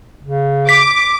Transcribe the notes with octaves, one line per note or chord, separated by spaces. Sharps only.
C#3
D6 B6